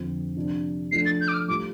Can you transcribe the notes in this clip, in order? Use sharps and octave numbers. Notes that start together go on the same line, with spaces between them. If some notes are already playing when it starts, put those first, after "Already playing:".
Already playing: F2 D3 F3 C4 F4
C3 F3 D4
F3 A3 D4 C7
A6
G6
D6
F6
A2 G3 F4 D6